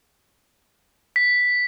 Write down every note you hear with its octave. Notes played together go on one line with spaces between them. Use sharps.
B6